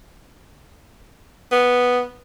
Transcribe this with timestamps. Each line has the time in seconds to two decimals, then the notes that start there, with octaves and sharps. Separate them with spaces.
1.52 B3